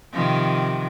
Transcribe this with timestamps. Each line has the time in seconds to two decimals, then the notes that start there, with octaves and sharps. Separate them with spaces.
0.13 C3 D#3 F3